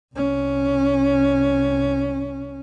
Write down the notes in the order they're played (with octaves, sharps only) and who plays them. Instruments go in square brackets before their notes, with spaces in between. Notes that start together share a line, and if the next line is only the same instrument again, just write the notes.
[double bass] C2 C#4